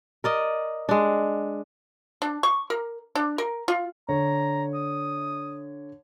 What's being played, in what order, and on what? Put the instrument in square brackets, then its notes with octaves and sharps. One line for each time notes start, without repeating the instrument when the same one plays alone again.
[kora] A#4 D5 D#5
G#3 D4
[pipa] D4
C#6
A#4
D4
A#4
F4
[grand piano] D3 C#5 [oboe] A#5
[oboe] D#6